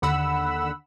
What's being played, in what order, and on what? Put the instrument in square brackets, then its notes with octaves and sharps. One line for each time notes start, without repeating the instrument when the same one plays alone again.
[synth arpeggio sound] D#2 D3 F#5 B5 E6